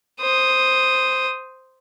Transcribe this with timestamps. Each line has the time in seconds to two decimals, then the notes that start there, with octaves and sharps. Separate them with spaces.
0.21 C5 D#6